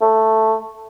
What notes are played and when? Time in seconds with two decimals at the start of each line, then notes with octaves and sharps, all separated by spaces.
0.01 A3